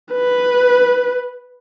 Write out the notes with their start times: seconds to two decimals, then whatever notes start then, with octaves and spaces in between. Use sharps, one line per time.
0.13 B4